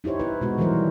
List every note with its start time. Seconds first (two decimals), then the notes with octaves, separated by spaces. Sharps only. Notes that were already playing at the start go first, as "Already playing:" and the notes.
0.04 D#4 E4 G4 C5 C#5
0.19 E4 B4
0.41 B2 G#3 F#4
0.58 D#3 E3 F#3 G3 A#4 C5